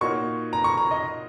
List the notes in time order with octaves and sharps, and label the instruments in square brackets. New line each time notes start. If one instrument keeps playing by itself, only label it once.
[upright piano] A#2 A#3 D#4 F#4 C#5 [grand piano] C#6
[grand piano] A#5
C#6
A#5
D#5